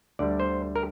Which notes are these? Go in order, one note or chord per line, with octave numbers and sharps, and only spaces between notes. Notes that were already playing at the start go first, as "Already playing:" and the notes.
D2 D3 G3 D5
C5
A#4